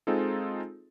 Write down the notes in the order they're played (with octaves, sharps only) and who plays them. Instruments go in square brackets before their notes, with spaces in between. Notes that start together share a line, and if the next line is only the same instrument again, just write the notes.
[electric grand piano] G#3 C4 D#4 F4 G#4 A4